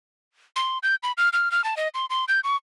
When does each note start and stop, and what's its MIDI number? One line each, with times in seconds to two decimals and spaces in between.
0.56 0.78 84
0.83 0.95 91
1.03 1.12 83
1.17 1.29 89
1.33 1.51 89
1.52 1.64 89
1.64 1.75 81
1.77 1.88 75
1.94 2.06 84
2.10 2.25 84
2.28 2.40 91
2.44 2.56 85